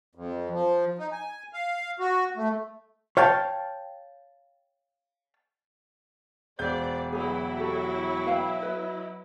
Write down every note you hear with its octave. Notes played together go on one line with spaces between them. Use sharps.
F2
F3
D#4
G#5
F5
F#4
A3
C#5 F5 G5 A5
E1 C5 D5 G6
F#3 B3 E4 G#4 B4
F#4 G4 A4 E5
B4 F5 G5
B4 D#5